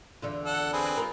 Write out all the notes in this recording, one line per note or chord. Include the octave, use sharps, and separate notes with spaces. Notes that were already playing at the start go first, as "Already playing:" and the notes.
E2 D3 F4
A4 F#5
C4 G#4 B4
F4 F#4 A#4